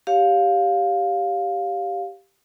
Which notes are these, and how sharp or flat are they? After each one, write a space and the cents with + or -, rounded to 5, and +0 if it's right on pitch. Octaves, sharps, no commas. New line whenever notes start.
G4 +0 C#5 -10 F5 +10